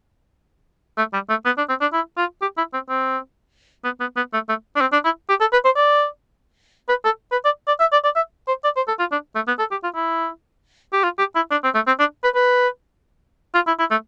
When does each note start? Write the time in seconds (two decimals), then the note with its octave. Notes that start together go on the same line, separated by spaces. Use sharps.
0.98 A3
1.13 G3
1.30 A3
1.45 B3
1.58 D4
1.69 C4
1.81 D4
1.93 E4
2.17 F4
2.42 G4
2.57 E4
2.74 C4
2.89 C4
3.84 B3
4.00 B3
4.17 B3
4.33 A3
4.49 A3
4.76 D4
4.81 C4
4.93 D4
5.05 E4
5.29 G4
5.41 A4
5.53 B4
5.65 C5
5.77 D5
6.89 B4
7.05 A4
7.32 B4
7.45 D5
7.68 D5
7.80 E5
7.92 D5
8.04 D5
8.16 E5
8.48 C5
8.64 D5
8.76 C5
8.88 A4
8.99 F4
9.12 D4
9.35 A3
9.48 B3
9.59 A4
9.72 G4
9.84 F4
9.95 E4
10.93 G4
11.04 F4
11.19 G4
11.36 E4
11.51 D4
11.64 C4
11.75 A3
11.87 C4
12.00 D4
12.24 B4
12.35 B4
13.55 F4
13.67 E4
13.80 E4
13.91 A3